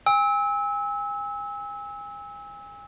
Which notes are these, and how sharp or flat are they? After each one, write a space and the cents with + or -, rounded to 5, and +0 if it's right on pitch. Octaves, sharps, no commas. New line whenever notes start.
G#5 -35 E6 -25